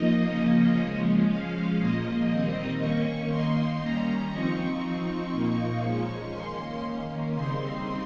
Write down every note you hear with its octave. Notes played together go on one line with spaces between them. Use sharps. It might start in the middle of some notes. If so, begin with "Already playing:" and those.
Already playing: F3 A#3 D#4 D#5
C#3 F3 A#3 C#4
F3 G#3 C#4
F3 G#3 C#4 F5
A#2 F3 A#3 D#5
D#3 G3 C4 D#4
D#3 A#3 C#4 C#6
D#3 A#3 D#4 C6
D#3 G3 C#4 A#5
F3 C4 D#4 C#6
F3 C4 D#4 C#6
A#2 F3 A#3 D#4 C#6
F3 G#3 C#4
D#3 A#3 C#4 C6
D#3 A#3 C#4
C#3 G3 C4 D#4 C6